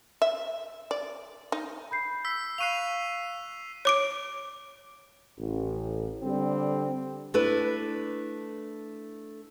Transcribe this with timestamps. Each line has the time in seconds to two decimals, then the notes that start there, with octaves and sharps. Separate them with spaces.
0.22 E5
0.91 D5
1.52 D#4
1.91 B5 G6 C7
2.25 E6 B6
2.58 F5 C#6 F#6 C7 D#7 F7
3.85 C#5 D6 D7
5.38 A1
6.22 D3 G3 C4
7.34 A3 D4 E4 B4